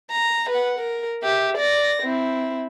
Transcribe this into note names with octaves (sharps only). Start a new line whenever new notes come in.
A#5
B4 F#5
A#4
G4 E5
D5 A#6
C4 E4